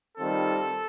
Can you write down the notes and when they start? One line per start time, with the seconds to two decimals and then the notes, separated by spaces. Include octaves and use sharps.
0.18 D#3 G3 C4 F4 A4